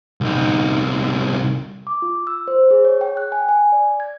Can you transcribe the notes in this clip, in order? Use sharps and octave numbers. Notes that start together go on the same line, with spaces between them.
C2 D#4
D6
F4
E6
C5
G#4
C#5
G5
F#6
G#5
G#5
D5
G#6